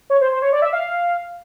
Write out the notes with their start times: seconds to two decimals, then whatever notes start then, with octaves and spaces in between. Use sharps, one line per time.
0.10 C#5
0.21 C5
0.32 C5
0.42 C#5
0.53 D5
0.62 E5
0.73 F5